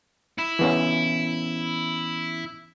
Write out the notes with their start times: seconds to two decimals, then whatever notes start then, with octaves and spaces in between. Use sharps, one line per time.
0.38 E4
0.59 E3 B3 C#4